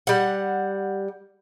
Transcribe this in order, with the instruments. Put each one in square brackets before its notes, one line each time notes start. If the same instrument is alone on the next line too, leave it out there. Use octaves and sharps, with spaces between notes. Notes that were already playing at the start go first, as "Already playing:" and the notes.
[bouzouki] G3 F#5